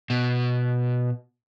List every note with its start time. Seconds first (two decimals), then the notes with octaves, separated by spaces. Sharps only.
0.10 B2